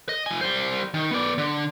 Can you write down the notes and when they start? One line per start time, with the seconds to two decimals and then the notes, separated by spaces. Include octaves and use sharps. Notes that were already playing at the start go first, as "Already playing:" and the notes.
0.09 D#5
0.26 F3 G#5
0.41 G3 C5
0.94 D#3
1.11 B3 D5
1.38 D3